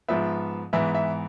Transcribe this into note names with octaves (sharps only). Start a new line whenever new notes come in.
G#2 F3 B3 E5
G#2 E3 B3 E5
E5